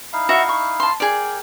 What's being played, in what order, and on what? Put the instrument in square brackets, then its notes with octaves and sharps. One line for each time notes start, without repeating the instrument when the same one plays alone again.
[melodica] D#4 E4 F5
[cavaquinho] F#4 C#5 E5
C#6
A5 C6
[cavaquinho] G#4 D5 [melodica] A#4 G5